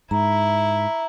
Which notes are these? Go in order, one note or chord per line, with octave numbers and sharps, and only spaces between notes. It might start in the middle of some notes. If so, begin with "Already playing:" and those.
G#2 E4 A#5